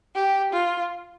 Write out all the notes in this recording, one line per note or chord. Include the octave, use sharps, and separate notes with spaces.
G4
F4